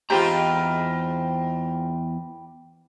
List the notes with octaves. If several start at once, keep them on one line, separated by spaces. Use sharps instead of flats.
E2 G#2 C4 F4 G4 B4 G5 A#5